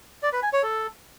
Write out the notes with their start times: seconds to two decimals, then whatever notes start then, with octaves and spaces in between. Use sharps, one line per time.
0.23 D5
0.33 B4
0.43 G#5
0.53 C#5
0.63 A4